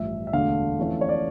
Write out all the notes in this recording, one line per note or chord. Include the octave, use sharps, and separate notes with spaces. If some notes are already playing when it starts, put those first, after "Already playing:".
Already playing: A1 G2 F3 E5
E5
E1 D2 D3 A3 D4 F5
F2 E3 A3 C#4
C#5
D5